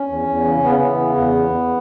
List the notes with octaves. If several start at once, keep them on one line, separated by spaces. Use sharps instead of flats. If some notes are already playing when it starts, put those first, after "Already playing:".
Already playing: C#4
E2
E2
C#3
C#3 B3
E3
C#3
E2